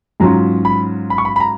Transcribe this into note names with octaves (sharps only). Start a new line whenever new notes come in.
G#2 F#3 C#4 F4 A#5
B5
B5
C#6
B5
B5
A#5